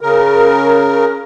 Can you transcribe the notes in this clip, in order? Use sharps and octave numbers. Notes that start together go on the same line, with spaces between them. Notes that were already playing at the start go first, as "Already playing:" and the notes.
C#3 A#4